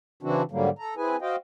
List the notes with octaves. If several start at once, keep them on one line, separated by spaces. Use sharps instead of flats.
C#3 E3 C4 D4 E4 F#4
G#2 D3 F#3 G3 A#3
A4 A#5
C4 E4 G#4 B4 G#5
F#4 C5 D#5 F5 G5